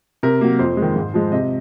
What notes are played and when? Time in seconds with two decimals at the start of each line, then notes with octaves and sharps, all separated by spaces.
0.23 C3 A#4
0.41 F#3 A#3
0.59 F2 C5
0.77 G#3
0.82 D#3
0.96 G#2
1.14 F3 G#3
1.32 C3 D#5